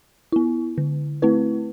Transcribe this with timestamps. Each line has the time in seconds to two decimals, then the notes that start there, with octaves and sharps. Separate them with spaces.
0.32 B3 E4
0.78 D3
1.22 A3 C4 E4 B4